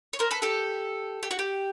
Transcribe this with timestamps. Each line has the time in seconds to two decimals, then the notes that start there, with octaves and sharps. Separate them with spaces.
0.13 C#5
0.19 A#4 C5
0.31 A4 B4
0.42 G4 A4
1.23 G4
1.31 F#4
1.39 G4